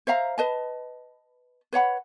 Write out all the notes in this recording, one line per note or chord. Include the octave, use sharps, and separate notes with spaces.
C5 E5 F5 A#5
B4 D#5 A5
B4 C#5 F#5 B5